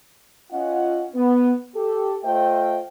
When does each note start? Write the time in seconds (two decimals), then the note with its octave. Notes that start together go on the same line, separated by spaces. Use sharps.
0.52 C#4 F4 D#5 F#5
1.15 B3
1.75 G4 A4
2.24 A3 F4 C5 D#5 E5 G5